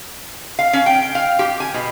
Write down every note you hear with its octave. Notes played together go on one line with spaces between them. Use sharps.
F5
C#4
G5
F5
G4
G#5
B2